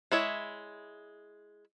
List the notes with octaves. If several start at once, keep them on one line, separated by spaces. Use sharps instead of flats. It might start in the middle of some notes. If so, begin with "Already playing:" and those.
G#3 E4 C#5 E5